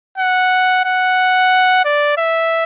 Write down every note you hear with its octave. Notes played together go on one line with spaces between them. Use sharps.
F#5
F#5
D5
E5